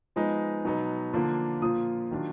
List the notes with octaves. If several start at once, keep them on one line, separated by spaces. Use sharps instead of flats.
F3 G#3 B3 D#4
B2 F#3 B3 D#4
D3 F3 A#3 D4 F4
A#2 F3 A#3 F4 D#6
D#3 F#3 D4 F4